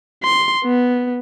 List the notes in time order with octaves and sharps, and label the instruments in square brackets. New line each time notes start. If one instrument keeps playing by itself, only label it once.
[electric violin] C6
B3